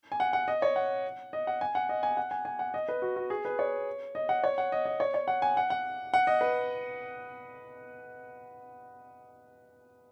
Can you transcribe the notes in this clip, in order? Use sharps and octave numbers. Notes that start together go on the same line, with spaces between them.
G#5
F#5
F#5
D#5
C#5
F#5
D#5
F#5
G#5
F#5
D#5
G#5
F#5
G#5
G#5
F#5
D#5
B4
F#4
F#4
G#4
B4
C#5
D#5
F#5
C#5
F#5
D#5
D#5
C#5
C#5
F#5
G#5
F#5
F#5
F#5
D#5
B4